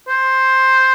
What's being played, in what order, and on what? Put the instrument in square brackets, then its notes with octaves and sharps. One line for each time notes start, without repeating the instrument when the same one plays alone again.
[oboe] C5